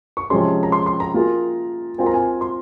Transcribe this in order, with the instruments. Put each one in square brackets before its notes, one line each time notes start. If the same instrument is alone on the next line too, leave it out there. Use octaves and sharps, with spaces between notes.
[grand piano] C#6
[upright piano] C3 F3 G#3 C#4 G#4 [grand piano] C6
[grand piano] A#5
C6
C6
A#5
[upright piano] A#3 F4 G#4
[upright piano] C4 F4 A#4 F5 [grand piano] G#5
[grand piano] A#5
G#5
C6